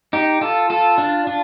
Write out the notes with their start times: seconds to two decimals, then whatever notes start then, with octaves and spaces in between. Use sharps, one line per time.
0.13 D#4 G4
0.41 F4 A4
0.70 F4 A4
0.98 D4 F4
1.27 D4 F4